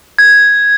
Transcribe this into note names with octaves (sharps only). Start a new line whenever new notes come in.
G#6